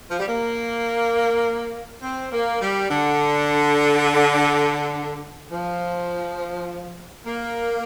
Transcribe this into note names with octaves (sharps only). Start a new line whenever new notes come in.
F3
G3
A#3
C4
A#3
G3
D3
F3
A#3